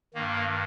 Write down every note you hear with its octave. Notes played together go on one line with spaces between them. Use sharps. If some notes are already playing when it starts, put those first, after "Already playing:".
G2 D#3 A#3